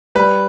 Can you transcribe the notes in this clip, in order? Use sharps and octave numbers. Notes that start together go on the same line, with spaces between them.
G3 B4